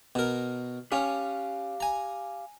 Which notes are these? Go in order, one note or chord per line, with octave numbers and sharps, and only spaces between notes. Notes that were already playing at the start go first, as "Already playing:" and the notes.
B2 A#4
C#4 G4 F5
G#5 A#5